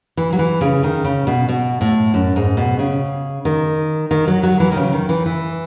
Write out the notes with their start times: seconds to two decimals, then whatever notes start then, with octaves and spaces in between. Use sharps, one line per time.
0.17 E3
0.33 F#3
0.39 E3
0.61 C#3
0.83 D#3
1.04 C#3
1.27 B2
1.49 B2
1.81 A2
2.14 F#2
2.36 G#2
2.57 B2
2.79 C#3
3.45 D#3
4.11 D#3
4.27 F#3
4.43 F#3
4.60 E3
4.71 D#3
4.76 C#3
4.93 D#3
5.09 E3
5.26 E3